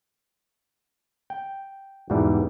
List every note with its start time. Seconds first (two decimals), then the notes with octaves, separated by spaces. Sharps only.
1.30 G5
2.10 E2 G#2 B2 E3 G3